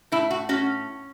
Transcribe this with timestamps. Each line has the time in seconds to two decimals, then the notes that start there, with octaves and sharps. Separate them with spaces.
0.12 A2 E4
0.31 F#4
0.49 C#4 F#4